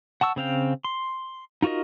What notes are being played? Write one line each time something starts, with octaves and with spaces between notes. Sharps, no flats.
F#5 A5 C#6 E6
C#3 C4 F5 G5
C6
D#4 F4 F#4 A#4 D#5